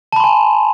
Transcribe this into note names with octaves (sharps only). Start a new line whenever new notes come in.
G#5 A5 B5 C6